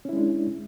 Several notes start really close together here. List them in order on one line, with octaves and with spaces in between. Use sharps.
C#4 E4 G#3 D4